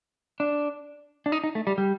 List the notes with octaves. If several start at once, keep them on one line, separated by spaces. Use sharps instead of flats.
D4
D4
D#4
D#4
A3
G3
G3